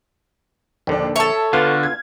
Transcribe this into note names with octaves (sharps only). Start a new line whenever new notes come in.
A#1 D#2 D3 D4
A4 C#5 E5 A5
D3 B3 F4 F6
G#6